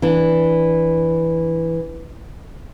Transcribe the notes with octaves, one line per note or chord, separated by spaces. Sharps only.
E3 D4